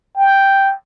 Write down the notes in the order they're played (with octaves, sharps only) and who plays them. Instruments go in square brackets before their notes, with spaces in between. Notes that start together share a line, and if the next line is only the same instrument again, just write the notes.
[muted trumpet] G5